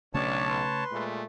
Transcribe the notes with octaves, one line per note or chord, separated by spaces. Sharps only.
B1 C#3 A3 C#4 D4 C#5 A5
B4 C6
A#2 G#3 A3